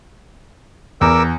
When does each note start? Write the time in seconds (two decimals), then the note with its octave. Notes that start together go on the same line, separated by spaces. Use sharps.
1.01 E2 A#4 D6 E6